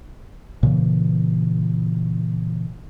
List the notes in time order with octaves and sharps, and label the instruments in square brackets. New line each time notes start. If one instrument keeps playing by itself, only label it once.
[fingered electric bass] A#2 C#3 E3